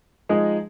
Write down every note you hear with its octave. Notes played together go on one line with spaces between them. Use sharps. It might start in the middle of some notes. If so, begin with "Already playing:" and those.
F3 G#3 D#4 G#4